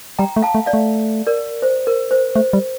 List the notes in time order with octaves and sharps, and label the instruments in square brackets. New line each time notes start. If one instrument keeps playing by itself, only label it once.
[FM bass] G3 [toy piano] G5 A#5
[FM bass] A3
[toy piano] F5 A5
[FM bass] A3
[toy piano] D5 F5
[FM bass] A3
[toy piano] A#4 D5
C5
A#4
C5
[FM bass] A3 [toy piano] C5
[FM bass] G3